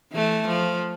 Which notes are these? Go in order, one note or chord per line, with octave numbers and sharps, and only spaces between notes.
E3 A3
F3